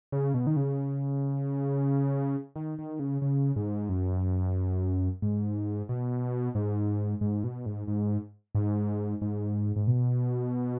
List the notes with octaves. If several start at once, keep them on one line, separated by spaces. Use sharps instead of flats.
C#3
B2
D#3
C#3
D#3
D#3
C#3
C#3
G#2
F#2
G#2
B2
G#2
G#2
B2
G#2
G#2
G#2
G#2
G#2
B2